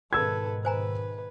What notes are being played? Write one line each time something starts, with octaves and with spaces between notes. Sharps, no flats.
G#2 B2 D#3 A4 B4 E6 G#6
B4 C5 G#5 A#5